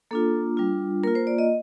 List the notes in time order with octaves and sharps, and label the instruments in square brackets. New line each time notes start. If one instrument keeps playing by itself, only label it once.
[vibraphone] A#3 D4 F4 A4
G3 D4 F4
A#3 F4 A#4
C5
D5
D#5